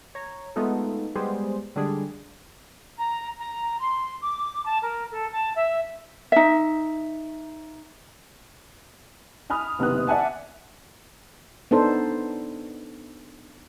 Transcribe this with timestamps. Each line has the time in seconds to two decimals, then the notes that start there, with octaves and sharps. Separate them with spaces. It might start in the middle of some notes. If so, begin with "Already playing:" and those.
0.15 C#5 A#5
0.56 G#3 A3 B3 D#4 F4 A4
1.16 G3 G#3 B3 G#4 C5
1.76 D3 G3 G#3 D4 G#4
2.97 A#5
3.38 A#5
3.80 C6
4.21 D6
4.65 A5
4.82 A#4
5.11 A4
5.32 A5
5.55 E5
6.32 D#4 E5
9.50 G#5 B5 D#6 F6
9.79 F#1 C3 D#3 B3 D#6 F#6
10.07 D5 E5 F#5 G#5 A5
11.71 B3 D4 D#4 A4 C5